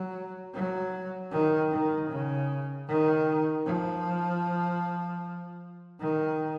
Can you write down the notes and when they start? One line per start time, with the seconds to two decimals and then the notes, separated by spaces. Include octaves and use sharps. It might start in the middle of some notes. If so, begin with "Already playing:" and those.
Already playing: F#3
0.54 F#3
1.31 D#3
1.71 D#3
2.09 C#3
2.88 D#3
3.65 F3
6.00 D#3